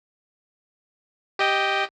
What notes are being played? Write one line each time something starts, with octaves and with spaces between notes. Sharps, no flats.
G4 D#5 G5